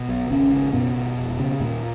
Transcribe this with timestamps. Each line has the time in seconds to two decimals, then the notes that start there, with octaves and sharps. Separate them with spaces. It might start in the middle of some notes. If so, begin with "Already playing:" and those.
Already playing: B2
0.09 B1
0.30 G#1 C#3 C#4
0.52 C#3
0.73 F#2 B2 B3
0.96 G#1
1.17 F1
1.39 C#3
1.60 D#2 A#2 A#3